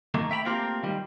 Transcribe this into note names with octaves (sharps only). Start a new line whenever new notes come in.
D#3 A3 A#3
E5 G5 A#5 B5
A3 A#3 C4 F4 G4 A#4
D#3 G3